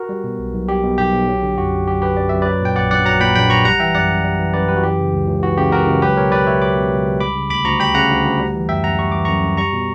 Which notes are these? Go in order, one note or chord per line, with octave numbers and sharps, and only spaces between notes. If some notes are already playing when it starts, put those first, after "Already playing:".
Already playing: F#4 A#4
G3
B2
B1
B1
G3 G4
B2
B1 G4
B1
F#3
D3
F#2 F#4
F#2
F#3 G4
D3 G4 B4
F#2 D5
F#2 E5
F#3 B4 D5
A#2 G5
A#1 D5 F#5
A#1 D5 F#5
F#3 F#5 A#5
A#2 G5 B5
A#1 G5 B5
A#1 A#5 C#6
G3 F#5 A#5
E3 E5 G5
F#2 D5 F#5
F#2
G3
E3
F#2 B4 D5
F#2 G4 B4
F#4
E3 G4
C#3
C#2
C#2
E3 F#4
C#3 G4
C#2 F#4 A#4
C#2
F#3 G4 B4
B2 A#4 C#5
C#2 B4 D5
C#2 C#5 E5
F#3 B5 D6
B2
C#2
C#2
G3 B5 D6
C#3
D2 B5 D6
D2 A#5 C#6
G3 G5 B5
C#3 F#5 A#5
D2
D2
G3
E3
F#2 E5 G5
F#2 F#5 A#5
G3 C#6
E3 D6
F#2 A#5 C#6
F#2
G3 A#5 C#6
B2